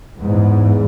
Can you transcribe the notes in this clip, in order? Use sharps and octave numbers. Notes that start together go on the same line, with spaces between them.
E2 G#2